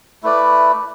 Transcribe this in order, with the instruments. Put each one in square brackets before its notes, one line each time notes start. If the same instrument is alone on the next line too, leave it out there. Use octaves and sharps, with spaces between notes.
[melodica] A3 E4 B4 D5